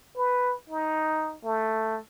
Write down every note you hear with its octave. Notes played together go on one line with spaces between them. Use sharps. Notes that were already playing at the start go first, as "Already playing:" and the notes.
B4
D#4
A3